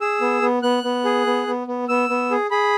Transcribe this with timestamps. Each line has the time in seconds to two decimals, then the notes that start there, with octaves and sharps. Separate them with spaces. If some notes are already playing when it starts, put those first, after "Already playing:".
0.01 G#4 E6
0.21 B3
0.42 B3
0.63 B3 F#6
0.84 B3
1.05 G#4
1.26 B3
1.47 B3
1.68 B3
1.89 B3 E6
2.09 B3
2.31 G#4
2.51 G#4 B5